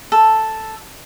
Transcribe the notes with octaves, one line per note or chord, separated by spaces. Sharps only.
A4